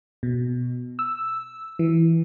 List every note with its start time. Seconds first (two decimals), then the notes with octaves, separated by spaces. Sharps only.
0.23 B2
0.99 E6
1.79 E3